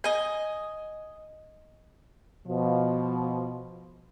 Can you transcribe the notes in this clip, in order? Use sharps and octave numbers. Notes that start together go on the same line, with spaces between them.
D#5 G#5
B2 F3